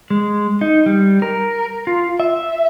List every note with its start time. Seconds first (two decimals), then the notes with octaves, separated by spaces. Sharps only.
0.10 G#3
0.61 D#4
0.86 G3
1.22 A#4
1.87 F4
2.20 E5